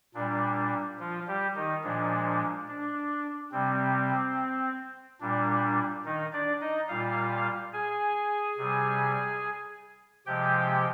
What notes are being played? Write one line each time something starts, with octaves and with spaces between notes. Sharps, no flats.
A#2 G3 D4
F3 F4
G3 G4
D#3 D#4
A#2 F3 G#3 D4
D4
C3 G3 C4
A#2 G3 D4
D#3 D#4
D4 D5
D#4 D#5
A#2 G3 F4 F5
G#4 G#5
C3 G3
C3 F3 G#3 G4 G5